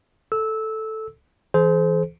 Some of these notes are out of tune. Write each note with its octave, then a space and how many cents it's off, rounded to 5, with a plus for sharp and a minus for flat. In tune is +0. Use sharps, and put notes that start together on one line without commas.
A4 +0 E6 -15
E3 +0 G#4 +45 C5 -15